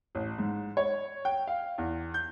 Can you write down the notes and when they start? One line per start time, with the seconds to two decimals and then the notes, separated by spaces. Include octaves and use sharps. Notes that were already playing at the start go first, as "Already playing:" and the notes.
0.15 A1
0.38 G#2
0.77 C#5
1.25 G5
1.47 F5
1.78 E2
2.14 G6